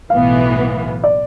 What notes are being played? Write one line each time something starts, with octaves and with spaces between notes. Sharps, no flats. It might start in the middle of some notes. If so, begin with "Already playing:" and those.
B1 A2 E3 B3 F5
D5